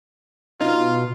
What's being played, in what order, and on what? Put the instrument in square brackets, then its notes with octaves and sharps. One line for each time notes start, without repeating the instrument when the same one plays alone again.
[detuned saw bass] B2 [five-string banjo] D#4 [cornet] F4